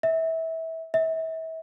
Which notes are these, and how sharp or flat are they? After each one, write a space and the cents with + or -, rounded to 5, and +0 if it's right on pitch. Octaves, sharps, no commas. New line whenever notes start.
E5 -25
E5 -35